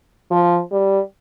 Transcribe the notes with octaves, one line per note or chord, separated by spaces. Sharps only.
F3
G3